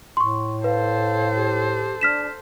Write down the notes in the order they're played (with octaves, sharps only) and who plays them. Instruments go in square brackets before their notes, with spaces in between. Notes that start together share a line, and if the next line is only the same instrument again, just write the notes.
[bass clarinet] A2 [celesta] C6 C#6
[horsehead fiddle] A4 C5 [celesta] B4 [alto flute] F5
[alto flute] G4
[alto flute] D4 [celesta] F6 B6 E7